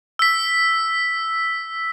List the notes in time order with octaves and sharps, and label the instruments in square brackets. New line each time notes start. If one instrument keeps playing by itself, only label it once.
[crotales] E6 B6